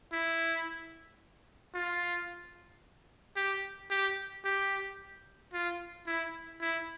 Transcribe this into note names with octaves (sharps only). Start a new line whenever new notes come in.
E4
F4
G4
G4
G4
F4
E4
E4